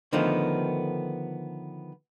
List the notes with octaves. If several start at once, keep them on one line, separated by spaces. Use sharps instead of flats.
D3 D#3 F3 A3 B3